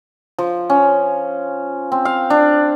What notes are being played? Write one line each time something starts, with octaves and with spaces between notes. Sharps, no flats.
F3
C#4
C4
F5
D4